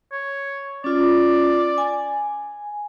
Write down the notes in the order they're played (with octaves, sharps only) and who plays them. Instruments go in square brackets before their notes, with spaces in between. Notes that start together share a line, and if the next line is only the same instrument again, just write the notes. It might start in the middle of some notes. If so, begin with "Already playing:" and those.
[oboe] C#5
[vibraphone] C#4 F4 [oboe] D5
[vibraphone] G#5